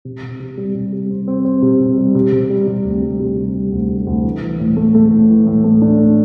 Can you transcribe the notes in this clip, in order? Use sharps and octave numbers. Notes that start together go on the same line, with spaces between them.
C3
C3
C3
G3
C3
G3
C4
C4
C4
C3
C3
G3
C3
C3
G3
C3
D2
G3
C3
G3
G3
D2
G3
D2
E3
E3
A2
A3
A3
A2
E3
A2
A3
D4
A3